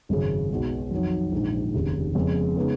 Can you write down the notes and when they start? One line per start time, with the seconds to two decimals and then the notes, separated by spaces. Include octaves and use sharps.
0.09 G#1 F#2 C#3
0.50 B1 B2 G#3
0.91 F2 D#3 F#3
1.32 A#1 G#2 D#3
1.74 F1 D#2 C#3
2.15 F2 C#3 G#3 B3
2.57 C#3 G#3 B3 D#4